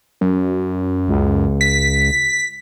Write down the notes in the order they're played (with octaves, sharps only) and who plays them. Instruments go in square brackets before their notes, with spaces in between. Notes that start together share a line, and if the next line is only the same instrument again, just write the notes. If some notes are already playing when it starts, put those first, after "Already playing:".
[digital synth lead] F#2
[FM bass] C#2
[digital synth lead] B6